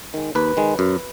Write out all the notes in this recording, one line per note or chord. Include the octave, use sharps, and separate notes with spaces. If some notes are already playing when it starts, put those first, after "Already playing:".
D#3 G#3
D#2 B4
D#3 G#3
F#2